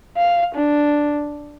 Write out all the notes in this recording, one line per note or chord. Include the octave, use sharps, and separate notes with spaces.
F5
D4